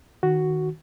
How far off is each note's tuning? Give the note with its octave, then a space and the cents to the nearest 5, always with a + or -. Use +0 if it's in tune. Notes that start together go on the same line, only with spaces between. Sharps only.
D#3 +0 F#4 +0